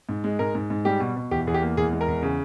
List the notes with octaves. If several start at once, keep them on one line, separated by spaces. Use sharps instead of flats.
G#2
G#3
G#2 A#4
G#2
G#2
G3 G4
B2
B2
E2 G4
E2 G#4
G4
A#3
E2 G#4
G#3
A#4
E2
C#3